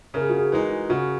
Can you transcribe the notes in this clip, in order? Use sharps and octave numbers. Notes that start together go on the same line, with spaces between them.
C#3 A#4
G#4
F#4
G#4
E3 G#3 D#4 G#4
C#3 F#4